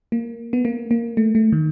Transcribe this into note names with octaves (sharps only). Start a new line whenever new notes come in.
A#3
B3
A#3
A#3
A3
A3
D#3